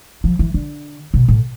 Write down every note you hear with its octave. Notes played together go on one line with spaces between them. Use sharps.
F3
E3
D3
B2
A2